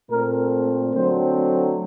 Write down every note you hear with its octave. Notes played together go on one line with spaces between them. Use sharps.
A#2 A3 C4 A#4
D3 F#3 A3 C4 C5